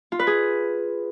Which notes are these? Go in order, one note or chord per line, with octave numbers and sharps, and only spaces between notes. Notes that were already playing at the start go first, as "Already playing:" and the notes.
F4
B4
G#4